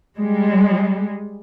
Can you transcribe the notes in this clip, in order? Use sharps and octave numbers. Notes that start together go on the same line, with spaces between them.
G3 G#3